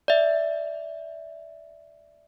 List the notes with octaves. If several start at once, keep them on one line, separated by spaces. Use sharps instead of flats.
D5 E5